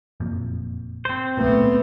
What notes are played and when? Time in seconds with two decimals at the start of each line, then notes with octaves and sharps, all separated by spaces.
0.20 F#1 F2 A#2
1.05 C4 C5
1.37 D1 B1 A#2 A3 B3